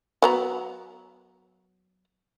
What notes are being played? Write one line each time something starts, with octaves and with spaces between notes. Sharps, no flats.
F#3 B3 A#5